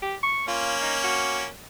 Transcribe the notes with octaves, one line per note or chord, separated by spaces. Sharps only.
G4
C#6
A#3 C#4 F4
D#4
F#4